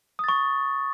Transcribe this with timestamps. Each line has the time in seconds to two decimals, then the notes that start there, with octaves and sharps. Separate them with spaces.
0.19 D#6
0.24 A6
0.29 C#6